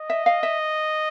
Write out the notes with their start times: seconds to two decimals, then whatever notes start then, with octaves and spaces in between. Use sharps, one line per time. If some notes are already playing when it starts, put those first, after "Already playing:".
Already playing: D#5
0.10 E5
0.26 F5
0.43 E5